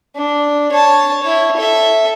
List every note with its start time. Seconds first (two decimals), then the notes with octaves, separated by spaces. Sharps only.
0.16 D4
0.72 C#5 A5
1.22 E4 C#5
1.56 A4 E5